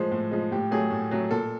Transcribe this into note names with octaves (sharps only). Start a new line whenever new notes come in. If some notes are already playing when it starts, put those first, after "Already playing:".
Already playing: A2 F3 G#3 C5
A2
F3 G#3
A2 G4
F#3 A3 G#4
A2
F#3 A3
A#2 A4